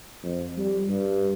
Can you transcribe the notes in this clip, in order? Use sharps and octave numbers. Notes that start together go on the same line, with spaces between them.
F2
G3
G2